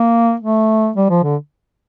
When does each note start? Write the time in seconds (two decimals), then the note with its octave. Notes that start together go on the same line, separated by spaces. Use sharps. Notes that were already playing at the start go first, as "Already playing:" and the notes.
Already playing: A#3
0.40 A3
0.96 G3
1.10 F3
1.24 D3